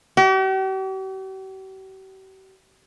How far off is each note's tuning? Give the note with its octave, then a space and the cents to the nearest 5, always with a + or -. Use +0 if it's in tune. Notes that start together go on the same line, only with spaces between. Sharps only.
G4 -45